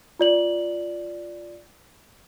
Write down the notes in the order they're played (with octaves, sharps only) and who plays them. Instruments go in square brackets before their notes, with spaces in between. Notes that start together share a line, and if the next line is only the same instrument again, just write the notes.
[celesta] F4 D5 F#7